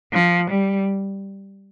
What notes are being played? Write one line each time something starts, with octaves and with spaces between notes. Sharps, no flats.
F3
G3